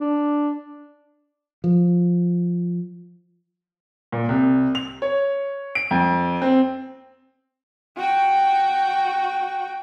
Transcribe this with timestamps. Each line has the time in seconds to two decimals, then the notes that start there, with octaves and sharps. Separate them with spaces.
0.01 D4
1.64 F3
4.12 A#2
4.29 C2
4.75 F7
5.02 C#5
5.75 D7
5.91 F2
6.42 C4
7.97 F#4 G5